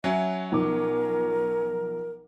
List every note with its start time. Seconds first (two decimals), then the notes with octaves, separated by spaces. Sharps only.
0.04 F#3 C#4 E5
0.52 B1 F3 A#4 D6